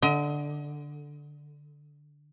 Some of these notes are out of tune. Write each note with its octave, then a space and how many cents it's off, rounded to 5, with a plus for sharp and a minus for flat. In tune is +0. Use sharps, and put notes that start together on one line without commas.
D3 +0 D#5 +35